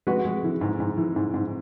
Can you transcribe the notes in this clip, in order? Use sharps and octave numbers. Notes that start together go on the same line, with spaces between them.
G#3 F#4 B4
G#3
E3
G#2
G#2
E3
G#2
G#2